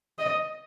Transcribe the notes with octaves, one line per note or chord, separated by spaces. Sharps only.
D#5